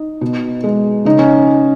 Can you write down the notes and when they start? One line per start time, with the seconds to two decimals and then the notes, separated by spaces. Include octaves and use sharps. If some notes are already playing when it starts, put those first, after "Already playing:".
Already playing: D#4
0.21 B2
0.64 G#3
1.05 C#3 D#4
1.19 C#4